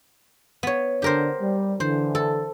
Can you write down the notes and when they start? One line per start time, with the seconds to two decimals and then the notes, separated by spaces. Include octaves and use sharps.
0.63 B3 C#5
1.02 D3 G4 A#4 C5
1.40 G3
1.80 D3 E3 C5
2.15 A4